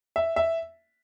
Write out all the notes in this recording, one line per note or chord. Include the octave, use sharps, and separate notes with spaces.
E5
E5